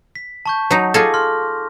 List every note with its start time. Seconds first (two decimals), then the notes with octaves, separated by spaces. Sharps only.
0.15 B6
0.46 A5 C#6 G6
0.71 F#3 D#4
0.94 F4 G#4 A4 D6 A#6
1.14 C6 F6